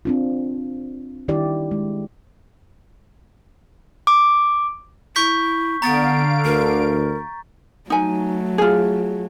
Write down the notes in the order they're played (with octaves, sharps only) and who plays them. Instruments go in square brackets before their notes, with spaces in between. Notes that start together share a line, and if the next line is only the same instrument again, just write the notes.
[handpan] C4 D4 F4
D#3 D4 E4 G4 D5
G#3
[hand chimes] D6
[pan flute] E4 [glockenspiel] C#6 G6 B6
[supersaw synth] D3 F5 D7 [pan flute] B3 [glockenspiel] A#5 A6
[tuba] D2 [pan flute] A#4
[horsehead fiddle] F#3 A3 [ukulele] D#4 G#5
[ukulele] F4 G#4